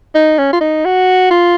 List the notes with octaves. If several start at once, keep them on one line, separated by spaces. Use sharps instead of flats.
D#4
C#4
F4
D#4
F#4
F4